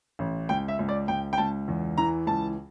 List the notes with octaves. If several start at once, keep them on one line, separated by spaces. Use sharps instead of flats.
A1
C#2 G5
E5
C#2
D5
C#2 G5
G5
C#2 A5
E2
E3 A#5
C#2 A5